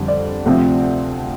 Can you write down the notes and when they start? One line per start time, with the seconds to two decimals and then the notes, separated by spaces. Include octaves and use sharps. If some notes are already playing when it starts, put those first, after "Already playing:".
Already playing: F2 D3 G3
0.08 D5
0.46 D2 C3 F3 C4